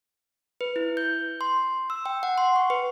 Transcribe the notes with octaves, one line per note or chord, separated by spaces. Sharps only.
B4
E4
G6
C6
E6
G5
F#5
C6
C#6
B4